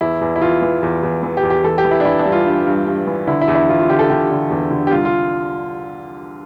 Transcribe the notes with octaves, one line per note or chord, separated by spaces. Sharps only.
E2 E4
E2
E4
E2 F4
E3
E2
E2
E3
G4
E2
G4
E3 A4
G4
E3
E4
D4
E3 E4
D4
G2
F4
G2
G2
G2
E3
D3 E4
E4
E2
E4
E2 F4
F4
D3 G4
A4
D3 G4
D3
E2
D3
G4
C2 F4
F4